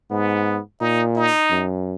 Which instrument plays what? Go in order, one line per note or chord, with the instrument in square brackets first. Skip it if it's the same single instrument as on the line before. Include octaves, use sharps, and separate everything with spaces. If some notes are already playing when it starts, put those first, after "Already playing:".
[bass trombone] G#2 [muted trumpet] B3
[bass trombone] A#2 [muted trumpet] D#4
[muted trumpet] D#4
[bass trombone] F#2